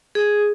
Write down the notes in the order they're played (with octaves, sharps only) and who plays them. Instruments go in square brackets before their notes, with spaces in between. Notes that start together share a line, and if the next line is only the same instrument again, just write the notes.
[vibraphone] G#4